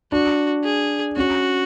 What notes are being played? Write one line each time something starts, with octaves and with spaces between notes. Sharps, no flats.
D4 F#4
G#4
C#4 F#4